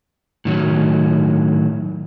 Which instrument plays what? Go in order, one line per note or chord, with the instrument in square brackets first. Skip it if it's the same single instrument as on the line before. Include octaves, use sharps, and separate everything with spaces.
[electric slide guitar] A2 D#3 F#3